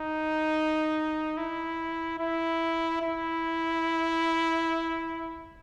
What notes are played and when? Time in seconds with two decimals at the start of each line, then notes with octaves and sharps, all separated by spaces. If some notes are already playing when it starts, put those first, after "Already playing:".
Already playing: D#4
1.37 E4
2.19 E4
3.02 E4